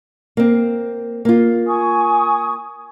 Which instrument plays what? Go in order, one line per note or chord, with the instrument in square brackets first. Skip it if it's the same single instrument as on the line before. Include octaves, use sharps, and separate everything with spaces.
[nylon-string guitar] A#3 C4
A#3 F4
[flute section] G#5 C#6 D#6